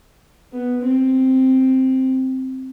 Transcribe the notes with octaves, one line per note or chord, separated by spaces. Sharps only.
B3
C4